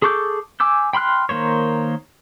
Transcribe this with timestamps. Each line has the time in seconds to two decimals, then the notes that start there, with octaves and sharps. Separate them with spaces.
0.02 G#4 A4 C#6 D6 G6
0.60 G#5 D6 E6 G6
0.93 G5 B5 C6 F6 F#6
1.29 D#3 A#3 C5 C#5